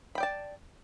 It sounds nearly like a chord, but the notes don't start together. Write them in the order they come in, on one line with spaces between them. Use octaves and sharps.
B5 G5 D5 A5